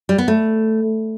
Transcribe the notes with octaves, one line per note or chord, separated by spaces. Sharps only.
G3
B3
A3